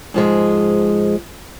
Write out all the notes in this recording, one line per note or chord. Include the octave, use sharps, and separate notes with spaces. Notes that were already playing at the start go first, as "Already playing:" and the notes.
G#2 F3 G#3